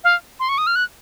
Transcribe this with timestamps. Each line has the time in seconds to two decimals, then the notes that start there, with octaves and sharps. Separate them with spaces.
0.04 F5
0.40 C6
0.49 C#6
0.58 D#6
0.67 F6
0.76 F#6